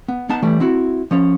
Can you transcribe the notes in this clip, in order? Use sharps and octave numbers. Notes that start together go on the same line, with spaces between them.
B3
B3 D#4 A5
E3 G3 A3
C4 E4 F#4
F3 C#4 C#5